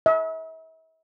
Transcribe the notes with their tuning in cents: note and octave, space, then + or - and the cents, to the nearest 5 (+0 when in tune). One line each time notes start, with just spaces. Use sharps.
E5 -40